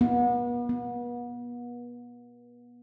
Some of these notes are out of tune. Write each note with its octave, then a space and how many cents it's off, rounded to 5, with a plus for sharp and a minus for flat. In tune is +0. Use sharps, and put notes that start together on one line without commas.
B3 -35
B3 -30